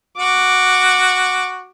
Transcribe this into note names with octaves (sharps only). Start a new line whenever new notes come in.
F#4 D6